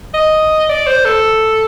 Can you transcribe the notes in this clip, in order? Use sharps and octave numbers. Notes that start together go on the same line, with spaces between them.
D#5
D5
C5
A4